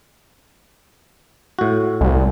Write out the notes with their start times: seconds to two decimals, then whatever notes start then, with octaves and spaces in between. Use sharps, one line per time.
1.59 A2 F#4
2.01 C2